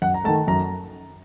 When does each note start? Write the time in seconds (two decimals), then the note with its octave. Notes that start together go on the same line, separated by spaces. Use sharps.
0.02 F#2 F#5
0.14 A#5
0.24 A3 A5
0.28 D#3
0.48 F#2 A#5